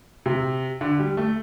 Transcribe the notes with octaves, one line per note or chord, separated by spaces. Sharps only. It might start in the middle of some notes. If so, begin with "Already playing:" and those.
C3
D3
G3
A3